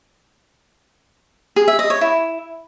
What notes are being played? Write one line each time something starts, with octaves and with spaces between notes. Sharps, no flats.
G#4
E5
D#5
C#5
E4